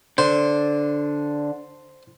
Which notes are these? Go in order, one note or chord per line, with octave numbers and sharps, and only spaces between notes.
D3 C5